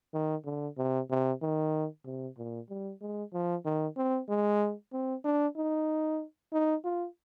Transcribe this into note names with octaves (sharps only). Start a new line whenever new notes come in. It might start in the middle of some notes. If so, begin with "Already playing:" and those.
D#3
D3
C3
C3
D#3
C3
A#2
G3
G#3
F3
D#3
C4
G#3
C4
D4
D#4
D#4
F4